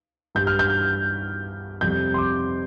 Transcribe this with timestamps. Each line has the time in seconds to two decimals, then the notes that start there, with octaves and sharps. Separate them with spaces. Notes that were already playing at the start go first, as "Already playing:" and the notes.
0.35 G2 G3 G6
0.47 F6
0.59 G6
1.81 F2 C3 G3 G6
2.14 C6
2.18 D6